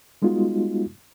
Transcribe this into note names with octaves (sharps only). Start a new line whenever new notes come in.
G3 G#3 B3 D#4 F4 F#4